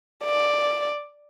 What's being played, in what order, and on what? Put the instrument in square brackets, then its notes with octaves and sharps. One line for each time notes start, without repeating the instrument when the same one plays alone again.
[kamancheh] D5